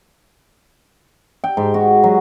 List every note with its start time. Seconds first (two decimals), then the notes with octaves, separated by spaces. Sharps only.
1.44 G5
1.57 G#2
1.74 F#4
2.04 F#3